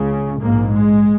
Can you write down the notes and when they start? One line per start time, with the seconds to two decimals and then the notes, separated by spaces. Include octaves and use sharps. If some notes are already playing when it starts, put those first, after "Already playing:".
Already playing: C#2 C#3
0.41 A#1 G#2 A#3
0.72 G#3